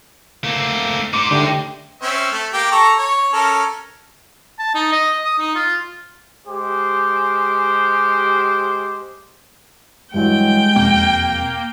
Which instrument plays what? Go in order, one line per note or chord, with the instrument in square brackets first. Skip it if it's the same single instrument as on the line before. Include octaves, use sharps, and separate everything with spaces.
[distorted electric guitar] A3 C4 [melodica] A#3
[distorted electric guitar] D#4 C5 [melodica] C6 [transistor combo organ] D6
[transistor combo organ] D3 [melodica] A3 G4 G5
[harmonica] C4 C#4 E5
A3
A#3 G4 G5
A4 A#5 C#6
C#5
C#4 A4 A#4
[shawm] A5
D#4
D#5
D#6
D#4
F4
[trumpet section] G#3 G4 C5
[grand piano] G2 E3 F#3 [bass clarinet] G#3 [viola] G5
[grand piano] E1 F2 [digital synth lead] A#3